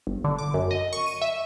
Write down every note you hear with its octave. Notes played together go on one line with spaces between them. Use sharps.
G1
D3
D6
F#2
D#5
C#6
D#7
E5